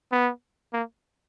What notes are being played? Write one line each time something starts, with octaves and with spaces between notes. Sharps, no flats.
B3
A#3